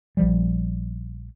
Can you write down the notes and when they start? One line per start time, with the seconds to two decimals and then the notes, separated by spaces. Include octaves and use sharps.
0.17 A#1 F3 G3